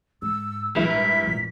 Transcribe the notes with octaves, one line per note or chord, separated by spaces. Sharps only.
G#2 E6
A#1 G2 E3 F#3 G#3 E4 B6
G#2 A#4
A#1 F2